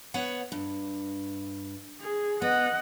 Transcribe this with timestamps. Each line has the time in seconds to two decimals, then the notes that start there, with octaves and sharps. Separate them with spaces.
0.14 B3 C#5 F#5
0.52 G2
2.00 G#4
2.42 B3 D#5 F#5